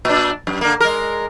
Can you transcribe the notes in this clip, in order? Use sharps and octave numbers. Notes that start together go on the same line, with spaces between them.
A#2 D4
F#2
D3 A#3
G#3 A#4